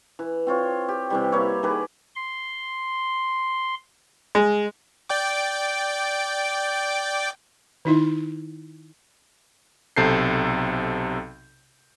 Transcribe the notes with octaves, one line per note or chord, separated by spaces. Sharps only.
E3
C4 F4 C#5
G4
C3 E3 G3
A#3 E4 C#5
D#3 G#4 B4 D6
C6
G#3
D5 G5 D6
D#3 D#4 E4
B1 C3 A4 G6 C7